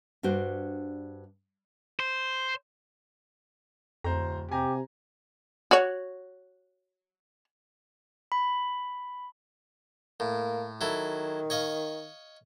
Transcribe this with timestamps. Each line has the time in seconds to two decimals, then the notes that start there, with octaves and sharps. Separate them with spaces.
0.23 G2 D4 F#4 C5
2.00 C5
4.04 D1 F2 C5 A#5
4.52 C3 G4 G#5 A#5
5.71 F#4 C#5
8.32 B5
10.20 A2 A#3
10.81 D#3 F#3 E4 A4
11.50 C#5 D#5 F5